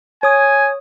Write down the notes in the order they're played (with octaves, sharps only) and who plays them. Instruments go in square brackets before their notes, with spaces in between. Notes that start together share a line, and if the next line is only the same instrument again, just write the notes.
[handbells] C#5 D#6 [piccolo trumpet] G#5